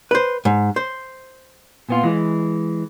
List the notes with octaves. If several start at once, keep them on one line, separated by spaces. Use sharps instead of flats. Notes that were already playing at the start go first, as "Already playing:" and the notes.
B4 C5
G#2
C5
A#2 B3 F4
E3 G#3